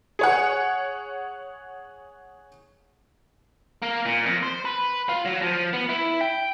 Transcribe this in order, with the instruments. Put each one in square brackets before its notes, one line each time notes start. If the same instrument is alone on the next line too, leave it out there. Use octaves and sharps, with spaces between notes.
[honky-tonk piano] G#4 C#5 F#5
[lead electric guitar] A#3
A#2
F2
C5
B4
F4
F#3
F3
B3
E4
G5